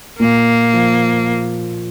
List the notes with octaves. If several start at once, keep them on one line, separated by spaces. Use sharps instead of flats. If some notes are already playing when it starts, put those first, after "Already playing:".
A#2 A#3
F3